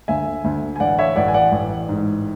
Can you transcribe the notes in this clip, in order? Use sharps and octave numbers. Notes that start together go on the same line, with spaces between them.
D2 E5 G#5
D2
G#5
A1 D5 F#5
C#5 E5
A1 D5 F#5
G#5
D5 F#5
A1
G#2